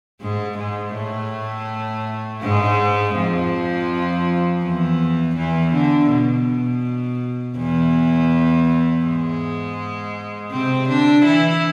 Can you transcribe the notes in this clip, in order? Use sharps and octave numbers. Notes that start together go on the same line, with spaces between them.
G#2 G#3
G#2 G#3
A2 A3
G#2 G#3
F2 F3
E2 E3
E2 E3
D3
B2
E2 E3
G#2 G#3
C3 C4
D3 D4
E3 E4